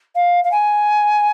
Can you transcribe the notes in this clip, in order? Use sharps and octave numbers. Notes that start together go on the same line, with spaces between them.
F5
F5
G#5